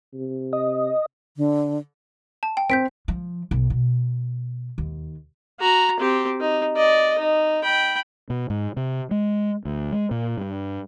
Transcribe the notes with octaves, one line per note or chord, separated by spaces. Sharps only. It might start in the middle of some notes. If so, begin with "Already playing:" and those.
C3
D#5
D3
A5
G5
C4 G6 B6 D7
F3
B1
B2
D#2
F#4 A#5
C4 G4
D#4
D5 D#5
D#4
G5 B5
B2
G#2
C3
G#3
D2
G#3
A#2
G2